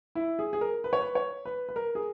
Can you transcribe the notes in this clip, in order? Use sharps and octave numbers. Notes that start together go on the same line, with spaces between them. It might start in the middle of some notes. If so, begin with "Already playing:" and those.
E4
G#4
G#4
A#4
B4
C#5
B4
C#5
B4
B4
A#4
G#4